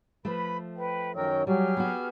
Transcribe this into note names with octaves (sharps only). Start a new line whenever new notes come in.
F3 A3 B4 B5
B4 G5
F#2 D#3 A#4 C#5 G5 E6
F#3 G3 G4 G#4 F6
B3 F#4